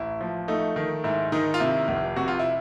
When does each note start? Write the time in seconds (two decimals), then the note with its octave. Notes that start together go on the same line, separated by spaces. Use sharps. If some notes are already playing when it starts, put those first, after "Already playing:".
Already playing: A1 E4
0.21 F3
0.48 A3 D#4
0.76 D#3
1.04 G#2 E4
1.32 D#3 D#4
1.54 F4
1.60 C3 E4
1.88 F1
2.16 C3 F#4
2.28 F4
2.39 E4